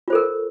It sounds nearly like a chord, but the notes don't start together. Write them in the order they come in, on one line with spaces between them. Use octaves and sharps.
F4 C5 A4 A#4